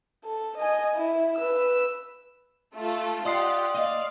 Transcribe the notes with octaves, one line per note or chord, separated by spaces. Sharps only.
A4
D#5 G#5
E4
B4 E6
A3 F4 A4
F4 G4 D5 D#5 F#5 C6 D#6 C7
D#2 D5 D#5 F5